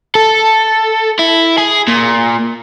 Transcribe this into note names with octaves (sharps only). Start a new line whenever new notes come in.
A4
E4
G#4
A#2